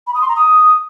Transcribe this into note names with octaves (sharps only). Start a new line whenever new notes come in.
B5
D#6
C6
A#5
D#6